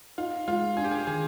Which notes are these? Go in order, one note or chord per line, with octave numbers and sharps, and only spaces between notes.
D#4 F4
G#3 F4
D4 G#4
G4
G#4
D#3 G#4